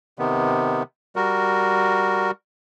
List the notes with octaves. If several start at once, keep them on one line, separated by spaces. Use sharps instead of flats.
C3 D#3 B3
G3 F#4 A#4